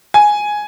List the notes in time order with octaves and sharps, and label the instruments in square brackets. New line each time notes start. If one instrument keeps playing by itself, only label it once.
[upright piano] G#5